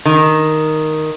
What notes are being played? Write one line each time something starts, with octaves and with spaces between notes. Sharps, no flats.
D#3